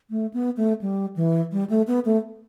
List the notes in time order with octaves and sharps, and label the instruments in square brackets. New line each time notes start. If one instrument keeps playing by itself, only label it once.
[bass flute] A3
B3
A3
G3
E3
G3
A3
B3
A3